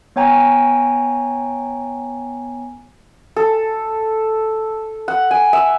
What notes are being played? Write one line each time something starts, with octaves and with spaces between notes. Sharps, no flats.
B3 C#5 G5 G#5 A#5
A4
F#5
G#5
E5